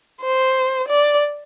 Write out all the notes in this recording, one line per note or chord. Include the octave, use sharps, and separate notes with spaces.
C5
D5